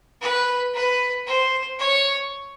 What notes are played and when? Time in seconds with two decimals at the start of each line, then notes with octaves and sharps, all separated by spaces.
0.22 B4
0.74 B4
1.27 C5
1.79 C#5